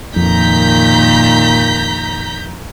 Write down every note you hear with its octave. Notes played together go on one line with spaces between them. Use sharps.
F2 A#2 D#3 A#5 G6 B6